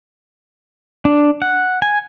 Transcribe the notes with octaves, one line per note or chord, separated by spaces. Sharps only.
D4
F#5
G#5